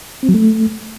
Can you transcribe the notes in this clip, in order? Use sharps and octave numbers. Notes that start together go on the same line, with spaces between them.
C4
F#3
A3